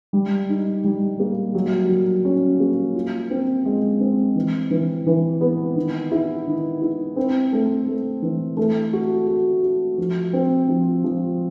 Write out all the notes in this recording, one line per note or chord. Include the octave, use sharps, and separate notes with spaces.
G3
D#4
G3
A#3
F#3
F#3
C#4
A#3
F4
C4
G#3
C4
E3
E3
E3
B3
D#3
E4
D#3
E4
C4
A3
A3
E3
A3
F#4
F#4
F#4
F3
C4
F3
F3